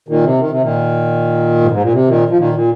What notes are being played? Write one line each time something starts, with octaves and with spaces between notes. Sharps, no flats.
A#2 D#3
C3
D#3
C3
A#2 D#3
G#2
F2
G#2
A#2
C3
A#2 D#3
F3
A#2 D#3
A#2